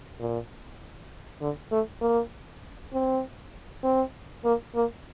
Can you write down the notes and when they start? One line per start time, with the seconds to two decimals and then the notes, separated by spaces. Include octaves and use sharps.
0.20 A#2
1.41 D3
1.71 A3
2.01 A#3
2.93 C4
3.84 C4
4.45 A#3
4.75 A#3